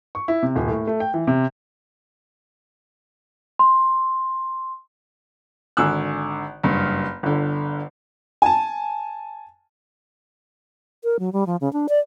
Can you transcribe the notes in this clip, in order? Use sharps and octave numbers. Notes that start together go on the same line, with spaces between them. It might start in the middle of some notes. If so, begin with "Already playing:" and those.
C#6
E4
C3
D#1
A2
A3
G5
E3
C3
C6
G#1 D3 G#5 E6 F#6
F#1 G2
G1 D3
G#5 A5
A#4
F#3
G3
F3
C#3
D4
D5